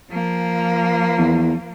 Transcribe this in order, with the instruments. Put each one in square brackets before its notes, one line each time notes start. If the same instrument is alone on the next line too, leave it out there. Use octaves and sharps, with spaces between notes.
[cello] F3 A#3
[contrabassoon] E2